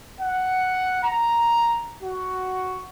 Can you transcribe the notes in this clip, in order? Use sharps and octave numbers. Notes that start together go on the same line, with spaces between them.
F#5
A#5
F#4